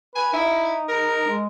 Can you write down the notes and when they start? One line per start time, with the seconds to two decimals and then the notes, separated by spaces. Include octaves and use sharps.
0.16 B4 G#5
0.33 D#4 E4
0.89 A#4
1.28 G#3